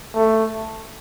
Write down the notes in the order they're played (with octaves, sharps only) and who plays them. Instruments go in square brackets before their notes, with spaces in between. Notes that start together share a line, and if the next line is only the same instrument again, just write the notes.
[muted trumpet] A3